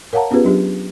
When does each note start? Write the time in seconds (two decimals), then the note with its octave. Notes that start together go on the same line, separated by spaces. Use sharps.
0.13 A#4 C#5 F5 F#5 A5 A#5
0.31 B3 C#4 F4 G4 G#4 B4
0.45 F#3 D4 G4